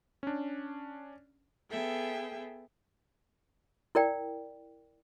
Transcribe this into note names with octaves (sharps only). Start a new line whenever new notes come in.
C#4 D4
B3 G#4 A4 E5 G5
E4 A#4 D5 G5